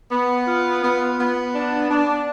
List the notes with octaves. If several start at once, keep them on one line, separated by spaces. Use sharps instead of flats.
B3
F4
B3
B3
D4
D4